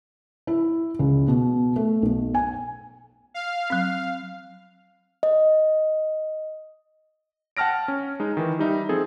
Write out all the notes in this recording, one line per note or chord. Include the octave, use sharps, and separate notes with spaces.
E4
C#2
B2
A3
B1
G#5
F5
F#3 C4
D#5
F#5 G5 A5 F6 A#6 D7
C#4
G#3 D#4
D#3 E3
G3 D#4 E5
F3 C4 G#4 A4